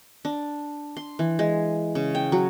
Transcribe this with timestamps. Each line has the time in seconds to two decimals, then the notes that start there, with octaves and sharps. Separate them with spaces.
0.25 D4
0.97 C6
1.19 E3
1.39 G#3
1.95 C#3
2.15 G5
2.32 F#3